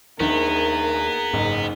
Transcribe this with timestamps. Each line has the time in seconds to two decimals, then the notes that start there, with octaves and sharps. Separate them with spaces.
0.20 D#2 D#3 B3 D4 G#4 A#4
1.33 F#1 G#2 D#4